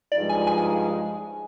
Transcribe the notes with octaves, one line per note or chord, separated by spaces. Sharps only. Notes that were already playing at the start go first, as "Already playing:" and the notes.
G2 F3 G#3 D#4 D5
G#5
G#5